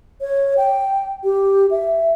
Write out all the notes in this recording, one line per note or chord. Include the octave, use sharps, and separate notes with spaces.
C#5
G5
G4
E5